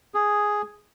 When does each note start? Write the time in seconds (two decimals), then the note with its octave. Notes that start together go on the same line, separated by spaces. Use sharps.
0.14 G#4